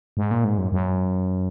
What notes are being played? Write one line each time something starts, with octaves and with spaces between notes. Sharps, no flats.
G#2
A#2
G#2
F#2
F#2